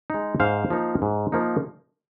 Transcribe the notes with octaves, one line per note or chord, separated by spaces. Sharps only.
G#3 D#4
G#2 C5 F5
F3 A#3 D#4
G#2
F3 A#3 D#4